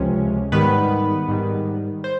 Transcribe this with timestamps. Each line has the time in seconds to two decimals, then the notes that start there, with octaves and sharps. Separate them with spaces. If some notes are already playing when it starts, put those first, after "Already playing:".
Already playing: C#2 C3 F3 G#3 C#4
0.52 G#2 D#3 G3 B3 B4
1.28 G#2 D#3 G3
2.04 C5